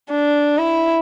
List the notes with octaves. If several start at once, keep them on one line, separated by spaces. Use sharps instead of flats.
D4
E4